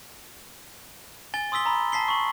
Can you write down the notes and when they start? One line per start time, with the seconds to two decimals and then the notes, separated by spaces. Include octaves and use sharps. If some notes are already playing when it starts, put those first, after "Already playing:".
1.34 G#5 A6 G7
1.52 C6 D#6 E6 B6 G7
1.66 A#5 B5
1.92 A5 B6 C7 G7
2.08 C#6 F#7